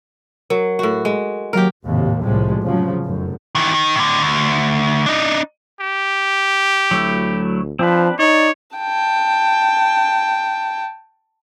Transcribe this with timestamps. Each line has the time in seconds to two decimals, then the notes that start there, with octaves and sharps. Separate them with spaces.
0.50 F#3 A#4
0.79 A2 F#4
1.05 G#3
1.53 D#2 F#3 G4 A#4 F6
1.84 G#1 D#2 A2 C3
2.23 C2 A2 F3 G3 G#3
2.62 F1 C#3 F3 F#3
3.03 F1 F#2
3.55 D#3 E3
3.74 D#3
3.96 A2 D3
4.22 D2
5.06 D4 D#4
5.80 G4
6.91 D2 F#3 A3 E4
7.79 F3 C4 D4 B4
8.19 D#4 C#5 D5
8.77 G5 A5